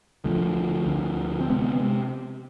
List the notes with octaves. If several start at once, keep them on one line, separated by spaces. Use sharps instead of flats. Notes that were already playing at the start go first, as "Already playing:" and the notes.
D2 D3 F3 A3
D2 D3
C4
C3 G#3 B3